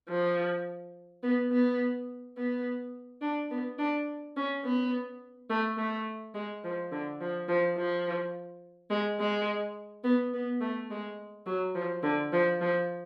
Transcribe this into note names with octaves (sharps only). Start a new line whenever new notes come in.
F3
B3
B3
B3
D4
B3
D4
C#4
B3
A3
A3
G#3
F3
D3
F3
F3
F3
G#3
G#3
B3
B3
A3
G#3
F#3
F3
D3
F3
F3